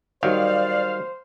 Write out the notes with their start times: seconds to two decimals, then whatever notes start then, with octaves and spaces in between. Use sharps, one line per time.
0.23 D#3 F#3 G3 C5 D5 F5